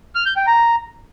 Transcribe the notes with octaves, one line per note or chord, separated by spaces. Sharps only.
F6
G6
G5
A#5